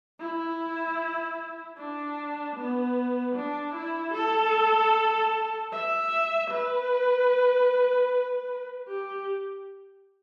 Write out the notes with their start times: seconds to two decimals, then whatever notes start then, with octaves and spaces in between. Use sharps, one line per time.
0.20 E4
1.78 D4
2.56 B3
3.36 D4
3.74 E4
4.14 A4
5.72 E5
6.51 B4
8.88 G4